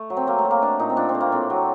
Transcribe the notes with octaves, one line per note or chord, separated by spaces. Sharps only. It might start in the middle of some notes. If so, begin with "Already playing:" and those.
Already playing: A3
F#3
C4
F#3 A#3
A3
F#3
A#3
A3 D4
A#2 D#4
C4
A#2 D4
C4
A3
A#3
A2 C4
F#3